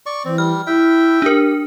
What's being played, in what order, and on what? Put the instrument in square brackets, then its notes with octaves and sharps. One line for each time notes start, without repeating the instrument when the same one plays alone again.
[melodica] D5 C#6
[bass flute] E3 [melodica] C4
[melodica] G3 [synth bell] F6
[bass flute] E4 [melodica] E5 G5
[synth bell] D4 A#4 [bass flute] G4